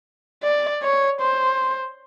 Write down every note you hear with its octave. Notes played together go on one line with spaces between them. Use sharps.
D5
C#5
C5